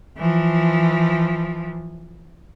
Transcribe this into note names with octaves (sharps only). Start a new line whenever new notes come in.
E3 F3